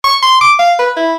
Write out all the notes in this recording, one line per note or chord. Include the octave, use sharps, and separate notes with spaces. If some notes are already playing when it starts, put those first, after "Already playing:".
C#6
C6
D6
F5
B4
E4